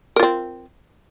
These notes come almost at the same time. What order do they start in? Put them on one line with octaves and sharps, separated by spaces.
A#4 F4 C4